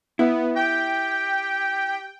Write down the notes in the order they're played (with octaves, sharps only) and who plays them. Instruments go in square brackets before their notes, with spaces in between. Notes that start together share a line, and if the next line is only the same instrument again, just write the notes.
[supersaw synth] B3 [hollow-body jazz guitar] E4
[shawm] G4 [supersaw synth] G5